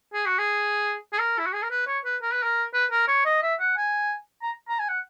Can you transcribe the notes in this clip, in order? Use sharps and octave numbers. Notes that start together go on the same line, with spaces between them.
G#4
F#4
G#4
G#4
A#4
E4
F#4
G#4
A#4
B4
C#5
B4
A#4
B4
A#4
B4
A#4
C#5
D#5
E5
F#5
G#5
A#5
A#5
G#5
F#5